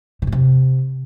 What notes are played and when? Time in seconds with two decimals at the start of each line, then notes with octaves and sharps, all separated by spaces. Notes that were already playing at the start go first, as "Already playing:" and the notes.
0.22 C3
0.27 G2
0.32 C3